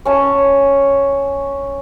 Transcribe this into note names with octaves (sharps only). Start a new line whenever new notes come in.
C#4 A5